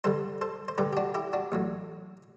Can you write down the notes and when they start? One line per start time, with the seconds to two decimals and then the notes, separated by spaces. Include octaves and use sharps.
0.04 G2 D3 G3 A4 C5
0.41 A4 C5
0.68 C5
0.78 G2 D3 G3 G4 B4
0.93 G4
0.97 D4 F#4
1.14 E4 G4
1.33 D4 F#4
1.52 A1 A2 F#3